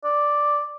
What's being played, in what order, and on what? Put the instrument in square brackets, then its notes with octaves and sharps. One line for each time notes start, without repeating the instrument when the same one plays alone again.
[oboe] D5